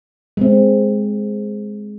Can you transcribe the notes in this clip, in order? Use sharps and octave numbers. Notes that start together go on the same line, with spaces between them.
G#3 C4